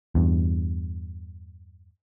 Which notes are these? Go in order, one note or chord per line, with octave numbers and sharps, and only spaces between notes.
E2 G2